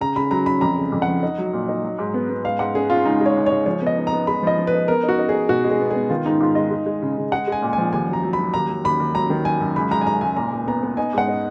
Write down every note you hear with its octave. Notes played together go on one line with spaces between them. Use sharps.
C#3 A#5
C#3 B5
F#3 A#5
C#4 B5
F2 A#5
C#3
F2
F#5
F3
D#4
F#3
A#2
D#4
F#3
G#2
B3
B3
G#2 F5
G#2 F#5
C#4 G#4
C#4 F4
C#2 D#4
G#3
C#5
C#2
C#2 C#5
F3 C#5
B3 D#5
D#4
B3 A#5
G#3 B5
F3 D#5
F3
B4
D#4
B3 A#4
D#4
F#4
D#4
G#4
D#4
B2 F#4
G#3
G#4
B3
G#4
B3
D#3 F4
G#2 D#4
G#2 F4
G#3 D#5
G#3
G#3
C#3
C#3
G#3 F#5
G#3 G#5
A#2
F3 G#5
D#2 G#5
F#3 A#5
F#3
B5
F#3
D#2 A#5
F#3
D#2 B5
D#2
F#3 A#5
D#3
F#3 G#5
F#2
C#2 B5
C#2 A#5
G#5
C#2 A#5
C#2 G#5
A#2 A#5
A#2
B3 A#5
B3
D#4 G#5
G#2 F#5
D#4